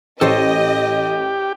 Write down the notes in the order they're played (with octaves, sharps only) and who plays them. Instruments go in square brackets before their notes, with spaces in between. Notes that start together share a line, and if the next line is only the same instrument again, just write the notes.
[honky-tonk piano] A1 [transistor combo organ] G4 [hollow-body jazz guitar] A4 C5 C#5 [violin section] D#5